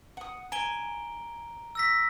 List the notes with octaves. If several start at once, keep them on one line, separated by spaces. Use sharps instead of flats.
F#5 D#6
G#5 A#5 D7 G7
E6 A#6 B6